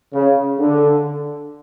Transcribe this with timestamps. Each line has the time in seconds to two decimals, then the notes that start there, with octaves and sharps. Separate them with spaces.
0.13 C#3
0.59 D3